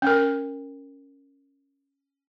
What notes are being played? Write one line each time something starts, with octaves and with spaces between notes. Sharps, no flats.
C#4 A#4